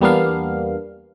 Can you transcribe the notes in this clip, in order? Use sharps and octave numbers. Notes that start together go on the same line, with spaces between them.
E2 G3 A#3 B3 D4 F5